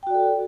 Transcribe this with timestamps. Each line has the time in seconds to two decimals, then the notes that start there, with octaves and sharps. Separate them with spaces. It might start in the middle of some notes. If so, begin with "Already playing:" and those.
0.03 G5
0.07 F#4
0.11 D5
0.14 A4